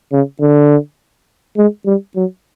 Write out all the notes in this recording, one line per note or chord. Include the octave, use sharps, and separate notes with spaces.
C#3
D3
G#3
G3
F#3